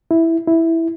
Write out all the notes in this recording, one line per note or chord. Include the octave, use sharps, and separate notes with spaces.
E4
E4